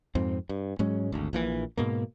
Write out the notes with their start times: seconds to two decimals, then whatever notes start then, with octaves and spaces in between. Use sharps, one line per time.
0.15 F2 G#2 C4
0.49 G2
0.79 G#2 F#3 G#3 C#4
1.12 G#1 D2
1.33 A#1 A#2 E3
1.77 G#2 B2 A#3